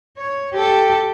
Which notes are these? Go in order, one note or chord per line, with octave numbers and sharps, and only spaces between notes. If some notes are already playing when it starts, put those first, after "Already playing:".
C#5
G4 A4